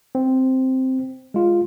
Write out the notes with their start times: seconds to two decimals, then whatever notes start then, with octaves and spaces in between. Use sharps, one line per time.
0.15 C4
1.34 G#3 F4